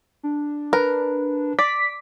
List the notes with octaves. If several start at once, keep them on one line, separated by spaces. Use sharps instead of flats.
D4
A#4 B4
D5 D6 B6